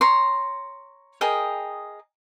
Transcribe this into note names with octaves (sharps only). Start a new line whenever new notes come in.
C#5 A#5 C6
G#4 A#4 D#5 G5